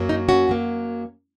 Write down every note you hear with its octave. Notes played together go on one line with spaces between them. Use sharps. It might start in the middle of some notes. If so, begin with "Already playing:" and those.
Already playing: F#2 F#3 A#3
D#4
C#4 F#4
F#2 F#3 A#3